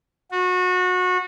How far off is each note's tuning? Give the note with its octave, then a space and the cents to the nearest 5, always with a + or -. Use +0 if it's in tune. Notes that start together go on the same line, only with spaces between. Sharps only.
F#4 -25